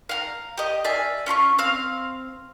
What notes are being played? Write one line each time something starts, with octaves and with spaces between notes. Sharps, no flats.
F5 F#5 A#5
G4 D#5
D5 E5 F5 G#5
C#4 F4 A5 C#6
C4 F5